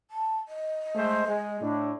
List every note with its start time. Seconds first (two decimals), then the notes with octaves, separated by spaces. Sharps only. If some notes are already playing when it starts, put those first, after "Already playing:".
0.11 A5
0.48 D#5
0.95 G#3 A3 C5
1.27 G#3
1.61 A2 D4